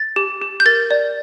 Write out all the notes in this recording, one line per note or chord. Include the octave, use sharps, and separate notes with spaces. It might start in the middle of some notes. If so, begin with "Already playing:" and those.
Already playing: A6
G4
G4
G6
A#4 A6
D5